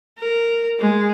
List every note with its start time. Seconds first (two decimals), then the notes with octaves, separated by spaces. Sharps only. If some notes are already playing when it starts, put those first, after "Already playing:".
0.19 A#4
0.79 G#3